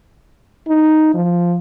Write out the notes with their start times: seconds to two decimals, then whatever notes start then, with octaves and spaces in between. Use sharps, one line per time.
0.68 D#4
1.15 F3